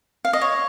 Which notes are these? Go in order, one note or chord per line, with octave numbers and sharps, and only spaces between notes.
F5
D#5
C#5